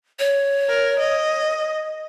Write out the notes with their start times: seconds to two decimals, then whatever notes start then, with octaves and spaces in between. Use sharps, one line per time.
0.19 C#5
0.69 A#4
0.99 D#5